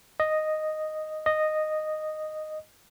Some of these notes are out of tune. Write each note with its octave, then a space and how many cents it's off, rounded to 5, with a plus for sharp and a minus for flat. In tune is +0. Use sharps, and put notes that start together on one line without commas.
D#5 -5
D#5 -10